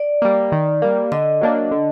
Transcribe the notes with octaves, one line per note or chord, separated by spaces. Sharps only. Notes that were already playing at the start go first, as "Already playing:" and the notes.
Already playing: D5
G3 A#3
D#3
G3 A#3
D3 D#5
F#3 A#3 D4
D3